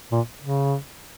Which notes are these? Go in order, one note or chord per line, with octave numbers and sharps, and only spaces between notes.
A#2
C#3